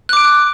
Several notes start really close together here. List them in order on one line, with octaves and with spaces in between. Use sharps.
F#6 D6 D7